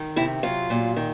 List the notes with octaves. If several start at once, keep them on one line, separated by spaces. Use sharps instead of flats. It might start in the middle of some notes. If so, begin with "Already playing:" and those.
Already playing: D#3
C3 E4
F#3 F4
A#2
D#3